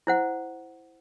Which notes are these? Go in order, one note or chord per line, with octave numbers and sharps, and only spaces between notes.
E4 C5 F#5